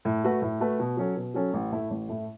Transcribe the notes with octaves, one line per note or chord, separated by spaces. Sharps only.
A2
A3 F#4 B4
A2
A3 F#4 B4
B2
F#3 C#4 A4 C#5
B2
F#3 C#4 A4 C#5
A1
A2 A3 E4
A1
A2 A3 E4